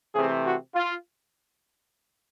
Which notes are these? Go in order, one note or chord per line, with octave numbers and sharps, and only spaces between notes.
C3 E3 A3 C4 G#4
F#4
F4